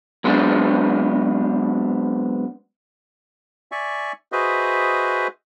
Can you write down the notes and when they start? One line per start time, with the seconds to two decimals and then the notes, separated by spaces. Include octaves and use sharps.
0.24 F#3 G#3 B3 C4 D4
3.72 D5 E5 G#5 C#6
4.32 F#4 G#4 B4 C5 D#5 E5